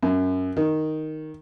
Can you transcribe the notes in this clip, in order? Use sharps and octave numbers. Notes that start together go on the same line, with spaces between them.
F#2
D#3